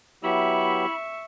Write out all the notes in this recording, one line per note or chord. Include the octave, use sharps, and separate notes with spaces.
F#3 B3 E4 G4 E5 B5 C#6